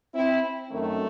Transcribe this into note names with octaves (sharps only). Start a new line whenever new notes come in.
C4 E4
F#2 D#3 A3 C4